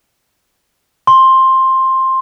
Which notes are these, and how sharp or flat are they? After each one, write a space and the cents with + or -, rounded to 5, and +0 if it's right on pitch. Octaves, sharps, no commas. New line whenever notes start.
C6 +10